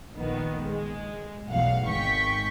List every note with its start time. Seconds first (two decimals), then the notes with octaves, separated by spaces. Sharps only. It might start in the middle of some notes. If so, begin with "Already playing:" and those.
0.16 A#1 D#3 B3
0.68 G#3
1.49 B1 E2 A2 F5 F#5
1.88 G#1 G#3 G5 C#6 B6